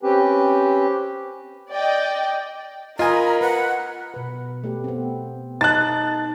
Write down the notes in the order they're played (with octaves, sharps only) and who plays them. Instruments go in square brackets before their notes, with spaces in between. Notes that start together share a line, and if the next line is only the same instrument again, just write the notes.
[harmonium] C4 C#4 B4 [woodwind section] G4
[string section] D5 D#5 G5
[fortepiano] F4 G#5 [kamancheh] A#4 B5 [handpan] D#5 [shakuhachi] A#5
[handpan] B4 [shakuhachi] F#5
[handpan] B2 B4
A3 G4
B3 C4
[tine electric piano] D#4 A5 [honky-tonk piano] F#6 A6